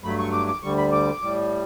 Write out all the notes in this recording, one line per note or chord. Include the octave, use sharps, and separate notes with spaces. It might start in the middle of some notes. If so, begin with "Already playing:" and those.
G2 F#3 A3 B5
C#6
D6
D6
D2 D3 G3 C#6
B5
D6
A2 G3